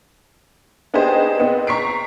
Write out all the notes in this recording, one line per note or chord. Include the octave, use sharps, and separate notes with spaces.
B3 D4 D#4 G4 G#4 C5
B3 C4 D#4
A#5 C#6 B6 C7 D7